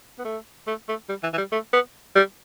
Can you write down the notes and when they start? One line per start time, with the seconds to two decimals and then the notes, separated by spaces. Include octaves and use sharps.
0.19 B3
0.25 A3
0.67 A3
0.88 A3
1.09 G3
1.23 E3
1.33 E3
1.38 G3
1.52 A3
1.73 B3
2.16 G3